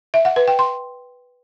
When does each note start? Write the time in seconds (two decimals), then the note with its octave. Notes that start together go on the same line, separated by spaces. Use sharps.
0.14 E5
0.25 F#5
0.36 B4
0.48 G5
0.59 C6